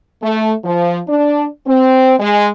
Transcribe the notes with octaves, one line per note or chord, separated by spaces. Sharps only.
A3
F3
D4
C4
G#3